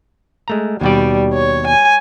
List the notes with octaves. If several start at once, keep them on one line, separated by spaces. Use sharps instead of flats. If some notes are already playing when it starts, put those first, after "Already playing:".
G#3 A3 A#5
D#2 B2 G3 D5
C#5
G#5